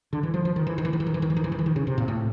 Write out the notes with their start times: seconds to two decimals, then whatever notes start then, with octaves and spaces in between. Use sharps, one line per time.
0.13 D3
0.23 E3
0.34 F3
0.45 F3
0.56 D#3
0.67 E3
0.78 D#3
0.85 E3
0.93 D#3
1.00 E3
1.07 D#3
1.14 E3
1.22 D#3
1.30 E3
1.36 D#3
1.44 E3
1.52 D#3
1.59 E3
1.66 D#3
1.76 C#3
1.87 C3
1.98 A#2
2.08 A2